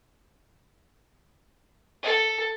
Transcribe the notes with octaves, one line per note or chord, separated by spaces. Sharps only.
A4